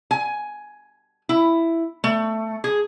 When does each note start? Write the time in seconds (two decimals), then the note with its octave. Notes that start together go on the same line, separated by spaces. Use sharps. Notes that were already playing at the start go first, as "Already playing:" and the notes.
0.11 G#5
1.29 E4
2.04 A3
2.64 G#4